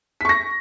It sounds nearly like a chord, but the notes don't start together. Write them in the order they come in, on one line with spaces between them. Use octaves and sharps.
B6 C#6 A#6